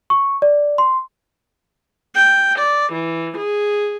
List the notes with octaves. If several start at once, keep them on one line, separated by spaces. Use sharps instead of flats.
C#6
D5
C6
G5
D5
E3
G#4